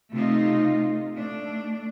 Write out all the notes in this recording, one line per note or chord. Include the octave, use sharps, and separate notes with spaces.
C3 A3 D#4 F4
A3 D4